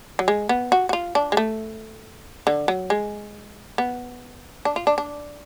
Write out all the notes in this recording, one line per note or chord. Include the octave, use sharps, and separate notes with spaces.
F#3
G#3
B3
F#4
F#4
F4
D4
G#3
A3
D3
F#3
G#3
B3
D4
F4
D4
D4